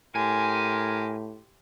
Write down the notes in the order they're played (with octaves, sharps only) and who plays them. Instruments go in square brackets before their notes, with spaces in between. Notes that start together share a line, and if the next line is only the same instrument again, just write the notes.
[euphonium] A2 [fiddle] G4 C6 [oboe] A#4 [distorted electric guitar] G#5